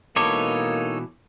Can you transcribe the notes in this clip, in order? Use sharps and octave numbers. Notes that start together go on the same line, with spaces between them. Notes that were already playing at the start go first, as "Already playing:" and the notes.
B2 E3 A#3 D#4 A4 C#5 D6